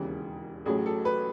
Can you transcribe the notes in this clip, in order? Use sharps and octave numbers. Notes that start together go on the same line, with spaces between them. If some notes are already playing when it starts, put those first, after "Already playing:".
Already playing: E1 D#2 C#3 E3 G#4
A1 A2 F#3 G#4
A4
B4